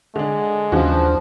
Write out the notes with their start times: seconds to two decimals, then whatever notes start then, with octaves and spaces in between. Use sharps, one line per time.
0.16 D3 G#3 D4
0.72 D#2 C#3 E3 F3 D4 F#4